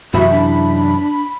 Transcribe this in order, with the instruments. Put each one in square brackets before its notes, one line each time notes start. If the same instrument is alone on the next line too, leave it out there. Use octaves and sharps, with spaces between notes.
[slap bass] F#2 C3 E3 [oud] D#4 E4 E5 [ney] F#4 [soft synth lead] B5
[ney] D4